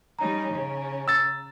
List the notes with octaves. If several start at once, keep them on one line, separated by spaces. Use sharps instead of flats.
G3 C#4 D#4 A#5
C#3 C#4
E6 A6